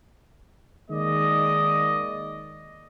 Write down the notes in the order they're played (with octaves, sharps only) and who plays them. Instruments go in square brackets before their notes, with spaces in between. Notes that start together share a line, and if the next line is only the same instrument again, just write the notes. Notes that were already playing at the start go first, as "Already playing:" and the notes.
[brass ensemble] D#3 G#3 A#3 D5 D#5